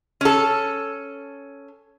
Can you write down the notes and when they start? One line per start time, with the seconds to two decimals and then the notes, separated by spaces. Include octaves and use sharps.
0.21 C#4 A4